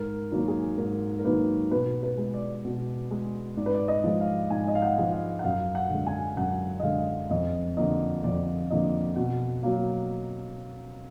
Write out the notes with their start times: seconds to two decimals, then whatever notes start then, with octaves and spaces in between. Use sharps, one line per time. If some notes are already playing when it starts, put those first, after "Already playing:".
Already playing: G#2 A#4
0.32 D#3 F#3 A#3
0.48 G#4
0.78 G#2 A#4
1.19 A#4
1.24 D#3 F#3 A#3 B4
1.71 B2 B4
2.03 B4
2.17 G#3
2.34 D5
2.65 B2
3.11 G#3
3.57 G#2 D5
3.66 B4
3.75 D5
3.88 D#5
4.04 F3 G#3
4.20 F5
4.50 G#2 G#5
4.68 D#5
4.75 F5
4.82 F#5
4.98 F3 G#3
5.13 F5
5.39 F#5
5.44 F#2 F5
5.75 F#5
5.90 D3 G#3
6.07 G#5
6.37 F#2 F#5
6.80 D#5
6.83 D3 G#3 F5
7.30 F2 D#5
7.77 D3 F3 A#3 D#5
8.24 F2 D5
8.71 D3 F3 A#3 D#5
9.16 B2 F#5
9.63 F#3 A#3 F5